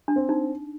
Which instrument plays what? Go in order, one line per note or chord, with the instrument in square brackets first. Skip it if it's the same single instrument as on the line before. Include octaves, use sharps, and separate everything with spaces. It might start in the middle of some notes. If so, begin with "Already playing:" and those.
[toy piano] D4
[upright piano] C4
[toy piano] D#4